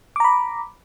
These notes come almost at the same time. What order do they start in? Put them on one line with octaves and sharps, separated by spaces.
D6 A#5 B5